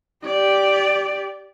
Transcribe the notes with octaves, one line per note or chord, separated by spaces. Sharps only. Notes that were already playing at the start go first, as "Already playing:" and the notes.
G4 D5